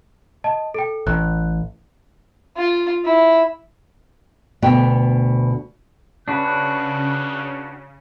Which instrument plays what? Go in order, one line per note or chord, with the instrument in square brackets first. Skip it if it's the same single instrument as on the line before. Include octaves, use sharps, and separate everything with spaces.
[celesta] D#5 A5
A4 G5
[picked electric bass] A1 [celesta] F#6
[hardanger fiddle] F4
E4
[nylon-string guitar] D2 B2 B3 G5
[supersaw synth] C#3 [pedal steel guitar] D4 F#4 B4 [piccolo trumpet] F#6